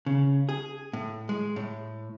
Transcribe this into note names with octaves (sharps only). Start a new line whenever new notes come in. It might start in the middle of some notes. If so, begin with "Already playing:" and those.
C#3
G#4
A2
G#3
A2